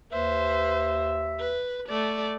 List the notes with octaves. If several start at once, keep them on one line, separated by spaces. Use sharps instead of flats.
D#2 B4 C5 E5
B4
A3 D5